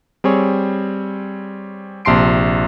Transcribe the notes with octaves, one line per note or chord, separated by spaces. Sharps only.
G3 C4 G#4 C#5
A#1 C3 A5 C6 C7 D7